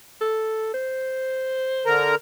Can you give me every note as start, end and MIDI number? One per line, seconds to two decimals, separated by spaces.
0.21 0.74 69
0.74 2.10 72
1.86 2.15 50
1.86 2.15 70
1.86 2.15 82